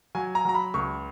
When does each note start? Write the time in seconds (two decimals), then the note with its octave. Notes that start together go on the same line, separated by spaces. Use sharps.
0.15 F#3 G#5
0.35 A#5
0.45 F#3 A#5
0.55 B5
0.74 C#2 C#6